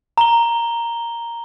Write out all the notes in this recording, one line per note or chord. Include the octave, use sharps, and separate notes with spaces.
A#5 G7